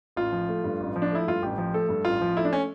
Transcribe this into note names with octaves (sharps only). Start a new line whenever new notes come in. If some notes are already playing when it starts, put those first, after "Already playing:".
A1 F4
F3
A3
G2
A1
F3
D4
A3 E4
G2 F4
A1 G4
F3
A3 A4
G2
A1 F4
F3
A3 E4
D4
C#4